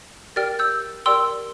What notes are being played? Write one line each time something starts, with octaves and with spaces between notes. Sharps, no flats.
G4 A#4 D5 G5 F6 A6
E6 G6
G4 A#4 D5 G5 C6 E6